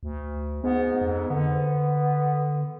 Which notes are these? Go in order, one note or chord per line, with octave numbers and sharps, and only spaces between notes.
D2
G#2 B3
F2
D3 B3